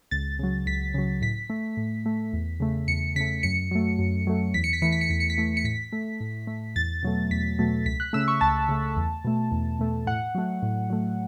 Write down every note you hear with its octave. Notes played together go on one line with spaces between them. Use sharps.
C#2 A6
C#3 F#3
C#2 B6
C#3 F#3
A2 B6
A3
A2
A3
E2
C#3 A3
E2 C#7
C#3 A3 B6
F#2 C#7
F#3 A3
F#2
F#3 A3
E2 B6
C#7
B6
E3 A3 C#7
B6
C#7
E2 B6
C#7
B6
E3 A3
C#7
A2 B6
A3
A2
A3
E2 A6
B2 F#3 A3
E2 B6
B2 F#3 A3
C#2 B6
F#6
C#3 A3 E6
C#6
C#2 A5
C#3 A3
E2
B2 A3
E2
B2 A3
A2 F#5
F#3 A3
A2
F#3 A3